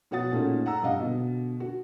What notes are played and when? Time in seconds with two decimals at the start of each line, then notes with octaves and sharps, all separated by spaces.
0.11 B2 F#4 C#5 F#5 D#6 A6
0.32 A#2 A3 C#4 D#4 G#4
0.66 F#5 A#5 E6
0.82 G2 C3 D#5 F5 F#5
1.00 B2 D3
1.60 F#4